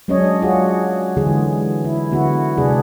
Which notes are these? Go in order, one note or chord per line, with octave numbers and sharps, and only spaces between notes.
F#3 G#3 C#4 D4 C#5 D#5
F4 F#4 G#4
D3 E3 G#3 G#4
E4
D3 B3 E4 F#4
C3 G#3 D4 G#4 B4